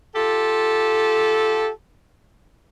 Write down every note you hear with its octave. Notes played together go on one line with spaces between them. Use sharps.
F4 G4 A4